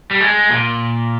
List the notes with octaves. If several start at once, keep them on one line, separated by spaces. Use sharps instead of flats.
G3
G#3
A#2